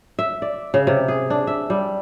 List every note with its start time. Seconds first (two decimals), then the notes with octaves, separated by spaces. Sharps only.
0.19 E5
0.42 D5
0.74 C#3
0.87 C3
1.08 G#4
1.30 D4
1.47 E5
1.70 G3